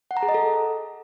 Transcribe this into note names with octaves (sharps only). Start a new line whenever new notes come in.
F#5
A#5
G#4
D#5
A4